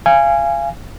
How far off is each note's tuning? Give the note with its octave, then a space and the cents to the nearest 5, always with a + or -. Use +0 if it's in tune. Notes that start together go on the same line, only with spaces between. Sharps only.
F5 -30 G#5 -5